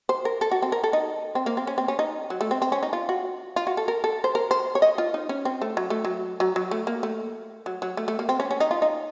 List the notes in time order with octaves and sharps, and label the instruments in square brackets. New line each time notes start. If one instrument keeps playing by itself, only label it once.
[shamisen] C5
A#4
A4
F#4
C4
A#4
A4
D#4
C4
A#3
C4
C#4
C4
C#4
D#4
F#3
A3
C4
C4
C#4
D#4
F4
F#4
F4
F#4
A4
A#4
A4
C5
A#4
C5
C#5
D#5
F4
D#4
C#4
C4
A3
F#3
A3
F#3
F#3
F#3
A3
A#3
A3
F#3
F#3
A3
A3
A#3
C4
C#4
C#4
D#4
F4
D#4